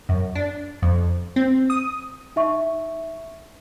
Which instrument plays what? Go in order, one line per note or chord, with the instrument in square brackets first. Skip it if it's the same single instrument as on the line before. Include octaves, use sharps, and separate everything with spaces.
[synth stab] F#2
D4
F2
C4
D#6
[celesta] D#4 E5 C#6